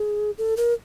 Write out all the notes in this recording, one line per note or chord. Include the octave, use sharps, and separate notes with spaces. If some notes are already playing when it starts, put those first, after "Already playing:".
Already playing: G#4
A4
A#4